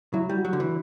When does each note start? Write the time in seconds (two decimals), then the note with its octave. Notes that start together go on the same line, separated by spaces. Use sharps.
0.14 F#3 E4
0.29 G3
0.37 F#4
0.45 F#3
0.53 D3
0.60 E3